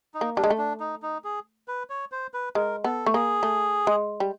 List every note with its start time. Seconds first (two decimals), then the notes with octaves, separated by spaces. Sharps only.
0.14 D#4
0.21 A#3
0.37 G3 D4
0.44 G#3
0.50 A3
0.58 D4
0.80 D#4
1.02 D#4
1.24 G#4
1.68 B4
1.90 C#5
2.12 C5
2.34 B4
2.55 G#3 A#4
2.84 B3 A4
3.06 A3
3.14 A#3 G#4
3.43 A3
3.87 G#3
4.20 G3